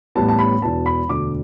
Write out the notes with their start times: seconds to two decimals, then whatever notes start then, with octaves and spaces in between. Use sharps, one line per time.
0.15 A1 A2 G3 B3 A5
0.28 A5
0.39 B5
0.62 E1 E2 B2 B3 A5
0.86 B5
1.09 E1 D2 D3 D6